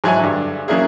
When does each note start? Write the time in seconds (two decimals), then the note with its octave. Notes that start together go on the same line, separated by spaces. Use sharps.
0.04 G#2 F#3 E4 G#5
0.19 G2 D3
0.68 C#3 F#3 A#3 D4 E4 G#4